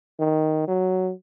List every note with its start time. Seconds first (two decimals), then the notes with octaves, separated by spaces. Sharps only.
0.20 D#3
0.68 F#3